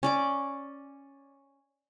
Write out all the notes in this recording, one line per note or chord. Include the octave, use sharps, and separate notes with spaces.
C#4 D5 D6